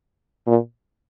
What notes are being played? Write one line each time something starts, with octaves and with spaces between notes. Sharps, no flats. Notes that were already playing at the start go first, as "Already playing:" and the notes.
A#2